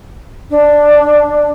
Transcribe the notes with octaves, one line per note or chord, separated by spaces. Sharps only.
D4